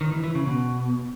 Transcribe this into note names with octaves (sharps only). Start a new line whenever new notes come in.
D#3
E3
E3
C#3
B2